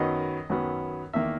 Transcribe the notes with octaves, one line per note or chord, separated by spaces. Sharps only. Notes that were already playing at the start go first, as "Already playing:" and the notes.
Already playing: F#2 D#3 F#3 B3 D#5
F#2 D#3 F#3 B3
E2 D#3 A#3 E5